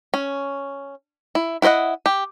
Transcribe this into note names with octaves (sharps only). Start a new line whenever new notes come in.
C#4
E4
E4 B4 C5 D#5 F#5
G4